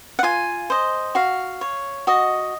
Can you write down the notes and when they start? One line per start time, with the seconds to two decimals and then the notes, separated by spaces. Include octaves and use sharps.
0.19 F#5
0.23 F4 G#5
0.70 C5 D#5
1.15 F#4 F5
1.61 C#5
2.07 F#4 D#5